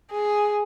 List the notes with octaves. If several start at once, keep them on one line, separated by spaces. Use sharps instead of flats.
G#4